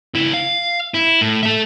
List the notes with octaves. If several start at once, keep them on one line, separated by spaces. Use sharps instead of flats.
C#2 E4
F5
E4
A2
A4 E5